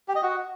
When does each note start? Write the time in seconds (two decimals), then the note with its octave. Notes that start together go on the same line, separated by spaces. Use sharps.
0.08 G4
0.16 D#5
0.23 F#4